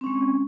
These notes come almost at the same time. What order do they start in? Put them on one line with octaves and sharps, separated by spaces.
C4 C#4 G#3